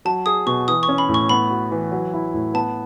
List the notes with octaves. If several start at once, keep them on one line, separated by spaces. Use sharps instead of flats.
F#3 A5
G#4 D#6
B2 C#6
E3 D#6
C#6
C#4
B5
A2
C#6
B3 B5
F#4
E3
F#3
E4
A2
B3 A5